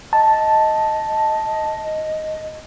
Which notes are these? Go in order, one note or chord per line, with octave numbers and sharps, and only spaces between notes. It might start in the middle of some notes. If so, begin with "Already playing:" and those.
D#5 A5